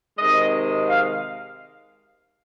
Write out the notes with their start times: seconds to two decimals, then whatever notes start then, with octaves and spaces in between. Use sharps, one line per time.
0.18 C3 D#3 G#3 D#5
0.89 F5